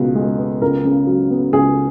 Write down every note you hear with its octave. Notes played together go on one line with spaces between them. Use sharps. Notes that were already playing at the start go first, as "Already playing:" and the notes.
Already playing: C#2 B2 B3
G#3
B3
C#2 A#4
C#3
F#3
B3
C#2 G#4